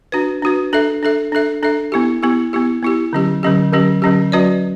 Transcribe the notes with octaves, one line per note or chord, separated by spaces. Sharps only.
D4 F#4 B4
D4 F#4 B4
D4 A4 E5
D4 A4 E5
D4 A4 E5
D4 A4 E5
B3 E4 G4
B3 E4 G4
B3 E4 G4
B3 E4 G4
D3 F#3 C#4 G4
D3 F#3 C#4 G4
D3 F#3 C#4 G4
D3 F#3 C#4 G4
F#3 C#4 F#4 B4 D5